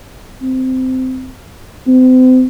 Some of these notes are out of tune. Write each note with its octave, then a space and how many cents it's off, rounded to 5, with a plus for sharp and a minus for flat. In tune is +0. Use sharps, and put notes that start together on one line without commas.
C4 -15
C4 -35